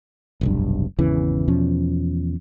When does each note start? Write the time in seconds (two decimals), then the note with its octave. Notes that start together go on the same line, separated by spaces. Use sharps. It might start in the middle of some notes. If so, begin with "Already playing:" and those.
0.41 F1 B1 G2
0.99 G#1 E2 C#3 E3
1.48 E2 B2 F3 C#4